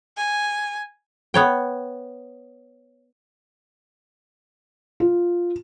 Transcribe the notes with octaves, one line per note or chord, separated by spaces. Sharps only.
G#5
B3 C#5 G5
F4